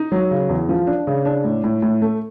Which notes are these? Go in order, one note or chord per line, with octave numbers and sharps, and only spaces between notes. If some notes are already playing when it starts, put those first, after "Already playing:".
Already playing: D#4
F#3
C#3
E2
F3
D4
C#3
D4
A2
A2
A2
A3